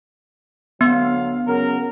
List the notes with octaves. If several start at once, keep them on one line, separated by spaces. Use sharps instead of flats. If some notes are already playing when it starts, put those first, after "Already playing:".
D2 F#3 B3 F5
C#3 F#3 A#4